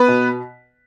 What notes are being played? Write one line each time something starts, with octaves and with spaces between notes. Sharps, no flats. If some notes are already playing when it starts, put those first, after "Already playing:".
Already playing: B3 B4
B2